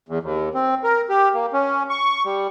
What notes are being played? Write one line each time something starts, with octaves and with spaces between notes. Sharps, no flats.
E2
D#2
C4
A#4
G4
A#3
C#4
C#6
G3